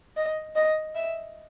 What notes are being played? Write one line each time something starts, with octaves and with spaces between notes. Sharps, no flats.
D#5
D#5
E5